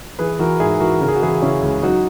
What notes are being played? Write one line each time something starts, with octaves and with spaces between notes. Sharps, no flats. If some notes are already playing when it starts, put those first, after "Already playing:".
E3 G#4 B4
E3 F#4 A#4
G#2 E4 G#4
E3 F#4 A#4
C#3 A#4
G#4
F#4
E3 E4 G#4
C#3 C#4 E4
C#2
F#3 D#4 F#4